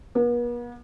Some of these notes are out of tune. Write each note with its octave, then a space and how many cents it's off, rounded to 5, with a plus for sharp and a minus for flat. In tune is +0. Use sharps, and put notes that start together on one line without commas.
B3 -45